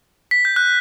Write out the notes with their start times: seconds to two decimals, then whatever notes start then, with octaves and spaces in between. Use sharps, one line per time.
0.31 B6
0.45 G6
0.56 F#6